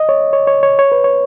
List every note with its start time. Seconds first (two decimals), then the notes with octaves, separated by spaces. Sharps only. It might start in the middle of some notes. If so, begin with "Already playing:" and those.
Already playing: D#5
0.09 C#5
0.33 C#5
0.47 C#5
0.63 C#5
0.79 C#5
0.92 B4
1.04 C#5